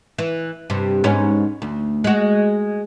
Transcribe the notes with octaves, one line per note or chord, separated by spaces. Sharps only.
E3
G2 C3
G#2 B3 C#4
D2
G#3 F#4